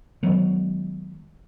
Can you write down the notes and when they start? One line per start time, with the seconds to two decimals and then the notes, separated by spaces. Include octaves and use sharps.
0.23 D#3 F#3 G#3 B3